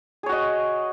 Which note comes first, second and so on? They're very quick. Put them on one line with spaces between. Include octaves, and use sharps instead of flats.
G#4 C#5 F#4 D#5